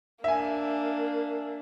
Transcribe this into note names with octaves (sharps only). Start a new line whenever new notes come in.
A#3 D4 E5 G#5